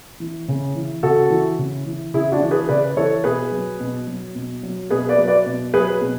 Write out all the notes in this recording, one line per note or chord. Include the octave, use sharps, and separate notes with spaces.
E3
C#3
E3
C#3 F#4 A4
E3
C#3
E3
C#3 E4 G#4
D4 F#4
E3
G#4 B4
C#3 B4 D5
E3 A4 C#5
B2 G#4 B4
F#3
B2
F#3
B2
F#3
B2 G#4 B4
B4 D5
F#3
B4 D5
B2
F#3 G#4 B4
B2